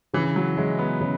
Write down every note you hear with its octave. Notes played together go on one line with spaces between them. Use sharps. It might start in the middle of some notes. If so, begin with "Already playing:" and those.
C#3 E3
F#3
F#3 G#3 E4 G#4
B3
C#3